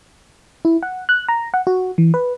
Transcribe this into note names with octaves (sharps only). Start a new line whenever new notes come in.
E4
F#5
F#6
A#5
F#5
F#4
E3
B4